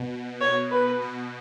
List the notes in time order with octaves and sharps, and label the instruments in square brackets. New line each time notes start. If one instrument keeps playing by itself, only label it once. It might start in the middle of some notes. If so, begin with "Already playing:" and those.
Already playing: [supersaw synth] B2
[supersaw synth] B2 [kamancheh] C#5
[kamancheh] B4
[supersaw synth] B2